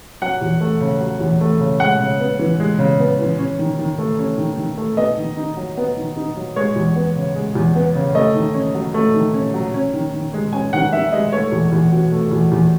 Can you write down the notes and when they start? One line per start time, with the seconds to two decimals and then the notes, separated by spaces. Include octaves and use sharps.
0.22 F#3 F#5
0.41 E2
0.61 A3
0.81 C#3
1.00 F#3
1.21 E2
1.41 A3
1.60 C#3
1.80 G#3 F#5
2.00 C#3
2.20 B3
2.39 E3
2.60 G#3
2.79 C#3
3.00 B3
3.19 E3
3.39 C#4
3.59 D#3
3.79 D#3
3.98 A3
4.19 C#4
4.38 D#3
4.57 D#3
4.78 A3
4.97 B3 D#5
5.17 D#3
5.37 D#4
5.57 F#3
5.77 B3
5.97 D#3
6.16 D#4
6.36 F#3
6.56 G#3 C#5
6.76 E2
6.96 B3
7.16 C#3
7.35 G#3
7.55 E2
7.76 B3
7.95 C#3
8.15 A3 D#5
8.34 D#3
8.54 C#4
8.75 F#3
8.94 A3
9.14 D#3
9.34 C#4
9.54 F#3
9.74 C#4
9.93 D#3
10.14 D#3
10.34 G#3
10.53 C#4 G#5
10.73 D#3 F#5
10.92 D#3 E5
11.12 G#3 D#5
11.33 A3 C#5
11.52 E2
11.72 E2
11.92 B2
12.12 A3
12.31 E2
12.52 E2